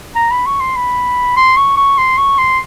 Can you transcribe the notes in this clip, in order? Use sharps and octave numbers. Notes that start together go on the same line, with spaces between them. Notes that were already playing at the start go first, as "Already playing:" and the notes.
A#5
B5
C#6
C6
B5
C6
C#6
C#6
C6
C#6
C6